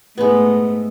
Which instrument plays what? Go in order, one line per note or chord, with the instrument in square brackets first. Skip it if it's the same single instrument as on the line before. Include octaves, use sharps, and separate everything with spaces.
[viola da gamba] G#2 A3 [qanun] G#3 B3